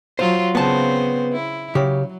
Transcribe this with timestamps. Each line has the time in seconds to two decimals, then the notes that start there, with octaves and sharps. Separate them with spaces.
0.19 F#3 F4 C5
0.55 C#3 B3 C4 C5 A5
1.33 E4
1.75 C#3 F#3 G4